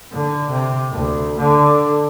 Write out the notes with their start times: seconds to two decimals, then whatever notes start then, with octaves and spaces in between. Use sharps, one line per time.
0.12 D3
0.50 C3
0.91 D2
1.39 D3